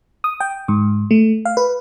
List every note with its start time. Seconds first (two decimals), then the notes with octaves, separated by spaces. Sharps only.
0.24 D#6
0.40 G5
0.68 G#2
1.11 A3
1.45 F5
1.57 B4